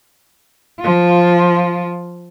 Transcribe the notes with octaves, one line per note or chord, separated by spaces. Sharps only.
F3 F4